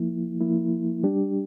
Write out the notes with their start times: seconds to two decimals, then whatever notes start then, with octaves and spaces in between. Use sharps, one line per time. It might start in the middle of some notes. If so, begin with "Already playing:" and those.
Already playing: F3 A#3 E4
0.41 F3 A#3 E4
1.03 G3 D4 G4